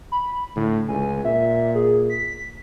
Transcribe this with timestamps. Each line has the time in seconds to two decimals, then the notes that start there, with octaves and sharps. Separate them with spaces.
0.12 B5
0.56 A2 D3
0.88 C#2 G#5
1.25 A#2 E5
1.75 G#4
2.10 B6